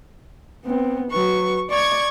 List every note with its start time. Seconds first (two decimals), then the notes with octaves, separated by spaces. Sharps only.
0.65 B3 C4
1.11 F#3 B4 C#6
1.70 D5 C#6 G#6